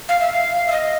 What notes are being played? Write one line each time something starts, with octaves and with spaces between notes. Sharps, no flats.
F5
E5
F5
E5
D#5